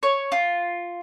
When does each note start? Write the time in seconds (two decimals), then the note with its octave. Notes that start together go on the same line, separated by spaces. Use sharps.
0.03 C#5
0.32 F4